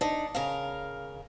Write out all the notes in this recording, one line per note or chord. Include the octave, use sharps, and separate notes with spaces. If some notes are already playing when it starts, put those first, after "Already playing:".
D4 D#4
C#3 A#4 F5